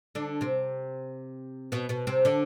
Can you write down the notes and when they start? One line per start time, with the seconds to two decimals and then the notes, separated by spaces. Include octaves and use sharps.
0.15 D3 D4
0.41 C3 C4
1.72 B2 B3
1.89 B2 B3
2.07 C3 C4
2.25 D3 D4